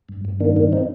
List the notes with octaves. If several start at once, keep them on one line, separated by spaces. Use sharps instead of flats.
G2
G2
D#3 A#3 D4
G2 A#3 D4
C4 D#4